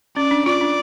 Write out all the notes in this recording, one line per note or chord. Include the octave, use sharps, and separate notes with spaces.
C#4 D5
D4
F4 D5
D4